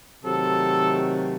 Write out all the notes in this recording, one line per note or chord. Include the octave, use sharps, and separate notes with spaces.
C3 D#3 F#3 A3 A4